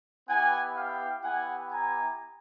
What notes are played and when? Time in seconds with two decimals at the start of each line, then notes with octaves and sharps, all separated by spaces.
0.29 B3 E4 G4 F#5 G#5
0.77 F5 G5
1.24 B3 E4 G4 F#5 G#5
1.72 G#5 A#5